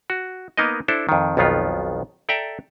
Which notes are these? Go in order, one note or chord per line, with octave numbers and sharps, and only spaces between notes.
F#4
A#3 B3 D#4 A#4 D#5
D4 E4 A4 C5
F2 D#3
B1 F2 D#3 B3 F4
A4 D5 E5 G5 A#5